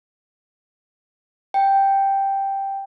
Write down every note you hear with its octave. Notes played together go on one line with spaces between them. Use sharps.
G5